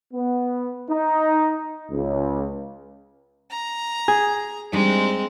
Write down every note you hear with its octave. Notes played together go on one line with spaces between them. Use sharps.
B3
D#4
C#2
A#5
G#4
G3 G#3 C4 D4 D#4